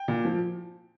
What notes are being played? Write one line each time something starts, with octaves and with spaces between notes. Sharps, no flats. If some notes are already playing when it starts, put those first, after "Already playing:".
Already playing: G5
A#2
F3